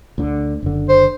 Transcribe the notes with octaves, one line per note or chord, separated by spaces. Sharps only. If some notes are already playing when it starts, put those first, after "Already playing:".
D2 D3
F#1 D3
C5